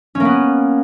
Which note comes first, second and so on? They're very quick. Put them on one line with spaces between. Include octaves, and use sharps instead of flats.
C#4 A#3 B3